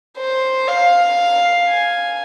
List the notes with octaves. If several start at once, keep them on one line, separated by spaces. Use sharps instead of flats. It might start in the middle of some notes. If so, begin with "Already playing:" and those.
C5
F5
G#5